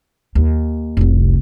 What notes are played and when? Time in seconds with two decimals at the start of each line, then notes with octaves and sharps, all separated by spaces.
0.35 D#2
0.97 F1 C2